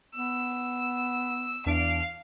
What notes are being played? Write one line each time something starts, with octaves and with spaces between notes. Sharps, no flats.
B3 E6
E2 D4 F5 D7